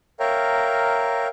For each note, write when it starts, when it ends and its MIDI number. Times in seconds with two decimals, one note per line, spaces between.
0.20 1.28 70
0.20 1.28 73
0.20 1.28 76
0.20 1.28 77
0.20 1.28 79
0.20 1.28 82